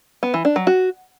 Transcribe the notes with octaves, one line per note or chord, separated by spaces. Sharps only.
B3
E3
D4
F#3
F#4